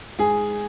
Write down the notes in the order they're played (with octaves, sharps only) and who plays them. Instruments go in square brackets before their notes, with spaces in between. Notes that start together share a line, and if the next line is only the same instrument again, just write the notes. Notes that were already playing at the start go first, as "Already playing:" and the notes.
[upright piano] G#2 G#4 G#5